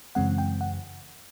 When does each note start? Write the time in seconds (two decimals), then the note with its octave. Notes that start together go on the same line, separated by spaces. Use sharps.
0.15 F#2 C#3 E3 G#3 C4 F#5
0.38 G5
0.61 F#5